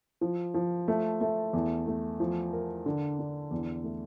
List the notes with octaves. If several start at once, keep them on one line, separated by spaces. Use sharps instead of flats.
F3
F3
A3
A3
E2
A3
F3
A#4
D3
D4
E2
A3